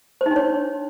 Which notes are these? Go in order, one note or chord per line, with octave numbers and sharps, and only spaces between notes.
C5
D#4
D4
C#5